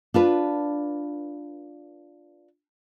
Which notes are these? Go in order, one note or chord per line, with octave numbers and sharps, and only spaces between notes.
D4 F4 B4